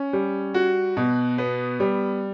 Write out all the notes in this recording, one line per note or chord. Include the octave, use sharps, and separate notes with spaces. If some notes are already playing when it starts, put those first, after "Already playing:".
Already playing: C#4
G3
F#4
B2
B3
G3